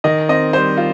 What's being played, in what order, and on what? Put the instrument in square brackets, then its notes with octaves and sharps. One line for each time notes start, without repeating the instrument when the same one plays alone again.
[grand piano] D#3 [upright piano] D#5
[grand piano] C4 [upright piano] D#5
[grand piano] G3 [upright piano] C5
[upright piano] F4